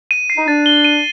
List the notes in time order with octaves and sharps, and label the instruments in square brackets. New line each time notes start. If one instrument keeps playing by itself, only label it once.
[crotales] D#7
C7
[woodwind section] D#4
[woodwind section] D4 [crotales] A6
[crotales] G7
D#7